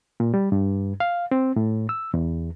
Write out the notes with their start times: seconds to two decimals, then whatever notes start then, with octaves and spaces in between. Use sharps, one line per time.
0.20 A#2
0.34 G3
0.52 G2
1.00 F5
1.31 C4
1.56 A2
1.89 E6
2.14 E2